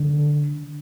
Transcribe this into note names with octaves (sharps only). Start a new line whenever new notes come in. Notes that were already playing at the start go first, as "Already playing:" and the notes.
Already playing: D3